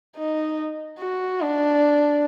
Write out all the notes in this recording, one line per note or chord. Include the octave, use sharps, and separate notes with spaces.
D#4
F#4
D4